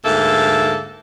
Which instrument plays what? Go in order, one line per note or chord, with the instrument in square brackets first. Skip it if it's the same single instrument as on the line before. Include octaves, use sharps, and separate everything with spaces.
[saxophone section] D2 G#2 A#3 A4 E5